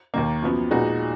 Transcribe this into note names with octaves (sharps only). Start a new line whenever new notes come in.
D#2 D#3 A#3
F#2 F3 B3
A#2 G#3 D#4 F#4 B4